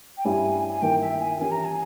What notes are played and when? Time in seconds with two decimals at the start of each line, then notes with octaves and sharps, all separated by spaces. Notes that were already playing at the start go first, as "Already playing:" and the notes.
0.17 G5
0.24 G2 G3 C#4 E4 G4 G#5
0.72 G#5
0.82 G2 D#3 A#3 E4 G5
1.01 E5
1.20 G#5
1.39 E3 A#3 C#4 E4 G4 G#5
1.52 A#5
1.65 G#5